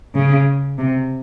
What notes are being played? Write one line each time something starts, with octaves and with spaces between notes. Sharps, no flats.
C#3
C3